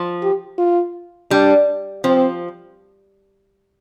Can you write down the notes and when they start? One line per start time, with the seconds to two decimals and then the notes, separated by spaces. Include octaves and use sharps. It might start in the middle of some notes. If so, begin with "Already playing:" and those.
Already playing: F3
0.23 G4
0.58 F4
1.31 G3 D4
2.04 F3 C4